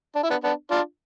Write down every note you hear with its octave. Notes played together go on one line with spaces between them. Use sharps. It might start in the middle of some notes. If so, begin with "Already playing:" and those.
D4
E4
B3 D4
B3 D4
D4 F4